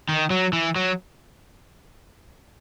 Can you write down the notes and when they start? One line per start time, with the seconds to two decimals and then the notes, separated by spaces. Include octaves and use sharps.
0.09 D#3
0.30 F#3
0.53 E3
0.76 F#3